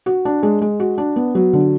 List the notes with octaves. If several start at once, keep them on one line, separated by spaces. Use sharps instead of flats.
F#4
D4
G#3
G#3
F#4
D4
B3
F#3
D3